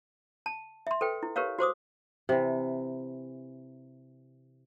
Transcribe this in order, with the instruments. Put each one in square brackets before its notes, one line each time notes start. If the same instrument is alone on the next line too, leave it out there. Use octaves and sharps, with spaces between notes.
[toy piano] A5
E5 C6
A4 B4 G5
E4
G4 A#4 B4 C#5 F5
F#4 C5 D6 D#6
[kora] C3 E3